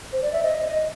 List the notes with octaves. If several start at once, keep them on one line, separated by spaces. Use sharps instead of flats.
C5
D5
E5
D#5